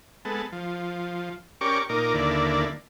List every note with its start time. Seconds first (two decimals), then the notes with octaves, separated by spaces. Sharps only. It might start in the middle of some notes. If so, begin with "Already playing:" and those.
0.25 G#3 B3 A4
0.52 F3
1.61 C#4 G4 A#4 D5 C#6 D6
1.89 A#2 D#4 A#4 D6
2.14 D#2 D3 A#3 E4 D5